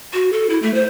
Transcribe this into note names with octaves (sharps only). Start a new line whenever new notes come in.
F#4
A4
E4
A3
C5